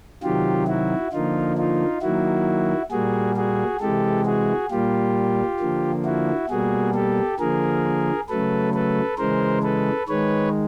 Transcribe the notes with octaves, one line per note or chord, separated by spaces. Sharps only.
C3 D#3 F#3 F4 G4
E4 F#4
D3 F3 A#3 D#4 F4
D#4 F4
D#3 F#3 A#3 E4 F#4
A#2 G3 A#3 F#4 G#4
F#4 G#4
C3 E3 G#3 G4 A4
F#4 G#4
A#2 G3 A#3 F4 G4
D3 F3 A#3
E4 F#4
B2 G3 A#3 F#4 G#4
G4 A4
D3 F3 A#3 G#4 A#4
C#3 F#3 A3 A4 B4
A4 B4
C#3 E3 G#3 A#4 C5
A4 B4
D#3 G#3 B4 C#5